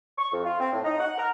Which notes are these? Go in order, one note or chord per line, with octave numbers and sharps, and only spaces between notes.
C#6
F2
F4
C4
A2
D#4
F#5
A#4